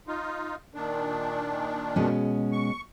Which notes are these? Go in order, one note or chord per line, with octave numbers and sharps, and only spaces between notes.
D#4 F4
A#2 D#3 D4
B2 G#3 C#4
C#6